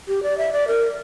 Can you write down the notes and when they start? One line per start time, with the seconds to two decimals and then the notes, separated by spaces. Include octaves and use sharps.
0.08 G4
0.23 D5
0.38 E5
0.53 D5
0.68 A#4